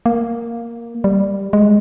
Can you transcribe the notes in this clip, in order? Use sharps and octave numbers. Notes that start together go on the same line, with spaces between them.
A#3
G3
G#3